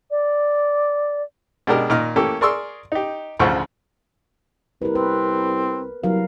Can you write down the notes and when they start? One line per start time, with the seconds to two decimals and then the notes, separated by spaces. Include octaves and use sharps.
0.11 D5
1.67 B2 G#3 D4 G4 A#4
1.90 A#2 D#3 D#5 F6
2.16 E3 A3 A#3 C#4 G4 A4
2.41 G#4 A#4 D5 C6 C#6 E6
2.92 D#4 G4
3.39 A1 D2 C#3 F3 C5 C#6
4.82 C2 A#4 B4
4.95 C4 B4
6.04 C2 F#3 A#4 F5